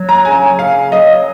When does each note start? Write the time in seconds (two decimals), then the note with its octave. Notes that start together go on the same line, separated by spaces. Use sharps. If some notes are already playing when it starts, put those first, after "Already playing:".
Already playing: F#3
0.09 A#5
0.25 C#3 G#5
0.58 C#3 F5
0.92 F#3 D#5